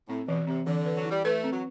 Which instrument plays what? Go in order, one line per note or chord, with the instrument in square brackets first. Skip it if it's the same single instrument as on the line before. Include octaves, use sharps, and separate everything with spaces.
[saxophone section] A2 [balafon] C4
[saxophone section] B2 [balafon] E3
[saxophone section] C3 [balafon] C4
[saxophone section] D3 [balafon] E3
[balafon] B4
[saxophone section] F#3
[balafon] E4
[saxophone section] G3
[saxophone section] A3 [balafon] B4
[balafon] C4
[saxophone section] F#3